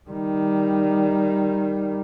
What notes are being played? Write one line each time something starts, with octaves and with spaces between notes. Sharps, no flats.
D#3 G3